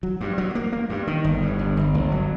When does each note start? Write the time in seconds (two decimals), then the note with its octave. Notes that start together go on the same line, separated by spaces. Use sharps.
0.03 F#3
0.21 G2
0.38 F#3
0.55 A#3
0.72 A#3
0.90 G2
1.07 D#3
1.24 G1
1.42 G2
1.59 G1
1.77 G1
1.94 G1
2.12 F#3